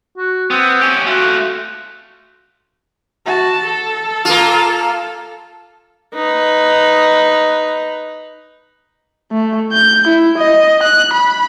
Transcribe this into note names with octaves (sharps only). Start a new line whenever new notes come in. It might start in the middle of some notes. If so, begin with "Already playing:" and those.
F#4
B3 C4
C#4 G4
A3 F4 F#4
F#4 A5
A4
A#3 F4
D#4 B4
A3
G6
E4
D#5
F#6
B5